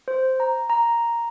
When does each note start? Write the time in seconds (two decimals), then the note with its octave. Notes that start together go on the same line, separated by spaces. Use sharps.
0.08 C5
0.40 A#5
0.70 A#5